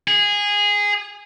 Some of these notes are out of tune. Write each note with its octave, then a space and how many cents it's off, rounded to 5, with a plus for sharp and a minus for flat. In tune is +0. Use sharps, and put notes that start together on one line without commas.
G#4 -15